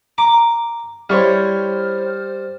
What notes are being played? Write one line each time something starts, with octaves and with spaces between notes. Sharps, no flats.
A#5 D6
G3 E4 C5 C#5 G5 F6